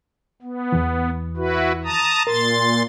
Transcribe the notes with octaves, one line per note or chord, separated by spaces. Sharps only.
B3
E2 E3
E4 F#4 B4
A5 A#5 D#6
A#2 A#4 C6 A6